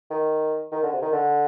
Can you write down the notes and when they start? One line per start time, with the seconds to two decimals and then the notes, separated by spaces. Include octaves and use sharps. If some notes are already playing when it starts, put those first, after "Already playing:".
0.10 D#3
0.72 D#3
0.83 D3
0.93 C3
1.02 D#3
1.12 D3